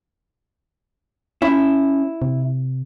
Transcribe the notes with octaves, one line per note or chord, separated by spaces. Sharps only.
C#4 E4
C3